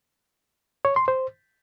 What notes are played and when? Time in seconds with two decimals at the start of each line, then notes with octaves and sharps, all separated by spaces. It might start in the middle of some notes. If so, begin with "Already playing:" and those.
0.85 C#5
0.96 C6
1.08 C5